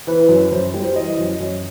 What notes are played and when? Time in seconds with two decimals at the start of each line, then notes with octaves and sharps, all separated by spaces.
0.07 E3 B4
0.29 F#2
0.52 F#2 C5
0.74 G3
0.84 C5
0.96 E3 D#5
1.19 F#2
1.40 F#2